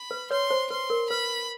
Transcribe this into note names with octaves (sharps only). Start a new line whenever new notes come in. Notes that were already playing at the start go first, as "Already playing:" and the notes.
Already playing: B5
B4
B4 C#5 C6
C5
B4 C6
A#4
B4 B5